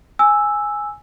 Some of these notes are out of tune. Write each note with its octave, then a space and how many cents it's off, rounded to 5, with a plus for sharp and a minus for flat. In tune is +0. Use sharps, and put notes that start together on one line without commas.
G#5 +0 E6 +0